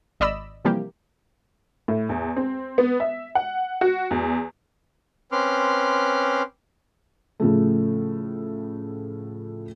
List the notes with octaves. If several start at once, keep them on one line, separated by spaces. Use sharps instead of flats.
G#1 D5 D#5 B5 E6
C3 E3 F3 G3 A#3 G4
A2
E2
C4
B3
E5
F#5
F#4
E2
C4 C#4 B4 C6 D6 F6
A2 C#3 F3 A3